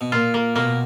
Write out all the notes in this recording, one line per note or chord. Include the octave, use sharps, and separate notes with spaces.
B2
A#2 F4
A#3
B2 A#3